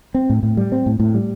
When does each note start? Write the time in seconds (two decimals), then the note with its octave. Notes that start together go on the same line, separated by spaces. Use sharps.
0.14 C4
0.30 A2
0.43 A2
0.57 G3
0.72 C4
0.86 A2
1.00 A2
1.14 G3